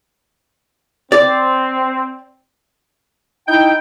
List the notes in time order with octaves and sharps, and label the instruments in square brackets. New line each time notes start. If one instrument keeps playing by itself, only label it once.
[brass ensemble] C4 [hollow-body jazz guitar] D5
[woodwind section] D#4 E4 G5 [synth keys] G6